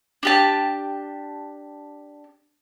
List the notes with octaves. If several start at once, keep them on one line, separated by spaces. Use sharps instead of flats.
D4 G4 A5